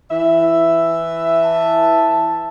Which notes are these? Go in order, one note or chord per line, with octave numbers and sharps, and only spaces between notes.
E3 E5
A5